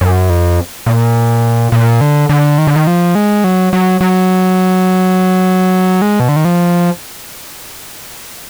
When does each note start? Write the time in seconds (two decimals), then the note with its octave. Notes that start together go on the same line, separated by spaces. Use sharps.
0.01 F#2
0.30 F2
0.86 A#2
1.72 A#2
2.01 D3
2.29 D3
2.58 D#3
2.67 D3
2.76 D#3
2.87 F3
3.15 G#3
3.44 F#3
3.73 F#3
4.01 F#3
6.02 G#3
6.20 B2
6.29 D3
6.36 D#3
6.45 F3